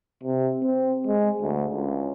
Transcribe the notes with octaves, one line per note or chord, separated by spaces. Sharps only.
C3
C4
G#3
D2
C#2